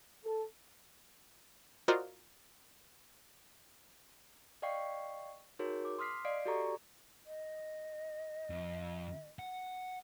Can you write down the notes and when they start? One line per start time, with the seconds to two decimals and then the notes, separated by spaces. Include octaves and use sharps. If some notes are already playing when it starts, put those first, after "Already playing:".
0.25 A4
1.88 F4 F#4 A#4 C5 D5 D#5
4.62 D5 D#5 F5 G5 C#6 C7
5.59 D#4 F#4 G#4 A#4 C#5
5.85 D6
5.99 C6 D#6 F6 B6 C7
6.25 D5 D#5 F5 C7 D7
6.45 F#4 G4 A4 D5 A#5 C#6
7.26 D#5
8.50 F2
9.39 F#5